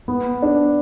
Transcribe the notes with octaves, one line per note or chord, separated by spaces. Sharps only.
B3
D4